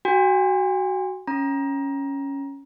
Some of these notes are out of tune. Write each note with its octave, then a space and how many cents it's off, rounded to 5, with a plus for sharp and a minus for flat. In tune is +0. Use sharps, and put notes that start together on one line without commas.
F#4 +15 G#5 -45
C#4 +0 A#5 +20